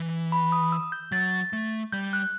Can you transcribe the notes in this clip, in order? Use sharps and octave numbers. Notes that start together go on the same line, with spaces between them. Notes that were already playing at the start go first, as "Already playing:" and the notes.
Already playing: E3
B5
D#6
E6
G6
F#3 A6
A3
G3 G6
F#6